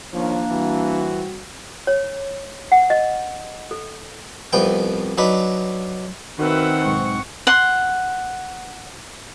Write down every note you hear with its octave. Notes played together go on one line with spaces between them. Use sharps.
D#3 F3 A#3 D4 C#5
E3 G3 C4 F#4
C#5
F#5
D#5
A4
C2 F2 B3 G5
F#3 D4 D#4 B4
D#3 C4 F#4 A#4 B4 E5 F#5
B1 G#2 G#3 C#6
F#5 C6